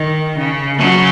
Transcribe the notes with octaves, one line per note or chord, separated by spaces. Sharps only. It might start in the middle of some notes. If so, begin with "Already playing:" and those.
Already playing: D#3
C#3
C#3 F#3